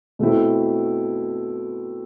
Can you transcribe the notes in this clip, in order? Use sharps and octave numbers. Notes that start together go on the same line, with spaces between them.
B2 A3 C4 E4